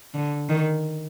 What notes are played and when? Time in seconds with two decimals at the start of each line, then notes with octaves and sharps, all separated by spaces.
0.14 D3
0.49 D#3